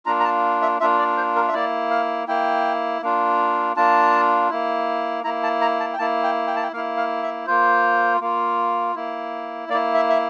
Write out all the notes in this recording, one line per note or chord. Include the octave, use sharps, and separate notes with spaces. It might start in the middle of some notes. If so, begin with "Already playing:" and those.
A#3 D4 F4 A#5
A#5
A5
E5
A#3 D4 F4 E5
D5
C5
A#4
E5
A#3 E4 D5
F5
A#3 E4 G5
A#3 D4 F4
A#3 D4 F4 A5
A#3 E4
A#3 E4 A#5
A5
A#5
A5
G5
A#3 E4 A5
G5
G5
A5
G5
A#3 E4 F5
F5
E5
A#3 F4 C5
A#3 F4
A#3 E4
A#3 D5
E4
E5
E5